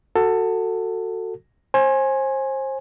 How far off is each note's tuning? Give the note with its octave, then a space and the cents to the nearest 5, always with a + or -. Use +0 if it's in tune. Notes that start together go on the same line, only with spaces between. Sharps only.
F#4 +0 A4 +20
C5 +30 G#5 +0